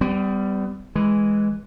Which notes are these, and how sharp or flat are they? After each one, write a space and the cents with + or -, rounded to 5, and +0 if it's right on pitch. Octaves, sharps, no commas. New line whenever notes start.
G3 +0 B3 +40
E3 +0 G#3 +0